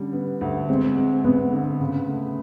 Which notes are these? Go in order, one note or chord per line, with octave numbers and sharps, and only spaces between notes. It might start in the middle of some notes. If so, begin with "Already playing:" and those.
Already playing: D3 G3 C#4
B3
D2
G#3 C4
G#3
G#3 B3
D3
C#3
A3